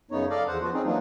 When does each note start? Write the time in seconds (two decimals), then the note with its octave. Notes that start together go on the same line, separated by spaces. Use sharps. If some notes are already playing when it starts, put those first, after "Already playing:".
0.11 F#2 C#3 B3 D#4 C#5
0.30 A4 D5 D#5 F5
0.47 E2 C5 F#5
0.61 F3 B3 F4 F#4
0.73 C4 C#4 D#4 G#4
0.85 E3 F#3 A#3 D4 D#4 F4